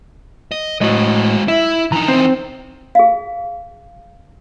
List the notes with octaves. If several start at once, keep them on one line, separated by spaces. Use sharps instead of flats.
D#5
A2 G#3 F#4 D#5
E4 E5
E3 D#4 A#5
C4 C5
G#4 F5